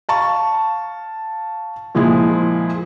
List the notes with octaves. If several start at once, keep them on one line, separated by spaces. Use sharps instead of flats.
F5 A5 C#6
A#2 F3 G#3 E4